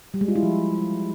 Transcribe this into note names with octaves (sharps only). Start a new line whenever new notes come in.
G3
G#3
F4
E4
F3